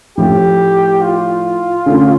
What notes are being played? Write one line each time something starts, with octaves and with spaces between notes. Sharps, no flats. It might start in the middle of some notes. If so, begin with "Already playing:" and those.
A2 F3 A3 E4 G4
F4
D3 A3 C#4